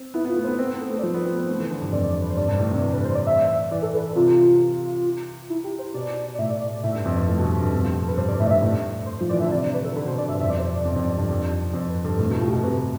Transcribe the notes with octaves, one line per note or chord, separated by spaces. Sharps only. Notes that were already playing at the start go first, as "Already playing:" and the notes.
Already playing: C4
B3 E4
B3 F4
A3
B3 C5
C4 B4
B3
A4
A3
D5
F3 C5
B3
C4
B3
A3
E3
D3
G2
F2 D5
B4
C5
G2 D5
G2
A2
C3
E3
B4
C5
D5
E5
E3 D5
A4
B4
A4
C3 F4
E4
G4
C5
B2 D5
D5
A2 E5
D5
D5
D5
A2 E5
G2
F2
G2
A2 A4
B2
G2
F2
F4
G4
A4
B4
G2 C5
G2 D5
A2 E5
D5
G2 E5
A2
C5
F3 C5
E3 D5
D3 E5
C3 D5
D5
B4
A4
D3 B4
B2 C5
D5
G2 E5
F2 E5
D5
C5
D5
F2
F2
G2
G2
F2
F2 C5
B4
G2 A4
A2
B2 E4
A2 F4
G4
B2 A4
C3 B4